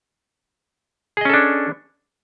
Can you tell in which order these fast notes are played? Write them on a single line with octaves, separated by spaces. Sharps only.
G#4 D#5 C#4 A4 D4